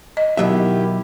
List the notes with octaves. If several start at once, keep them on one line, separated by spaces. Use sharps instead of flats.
D#5
B2 D#3 F#3 E4 G4 E5